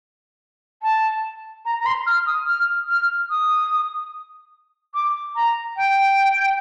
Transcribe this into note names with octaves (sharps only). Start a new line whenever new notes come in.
A5
A#5
A#5
C6
F6
D#6
F6
F6
D#6
D6
A#5
G5